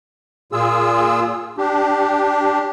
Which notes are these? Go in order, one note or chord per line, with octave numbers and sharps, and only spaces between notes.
A#2 F4 G#4 E6
D4 G4